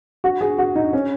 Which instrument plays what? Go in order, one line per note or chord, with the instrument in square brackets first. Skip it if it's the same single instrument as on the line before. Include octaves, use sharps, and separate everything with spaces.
[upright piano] F#4
G#4
F#4
D#4
C#4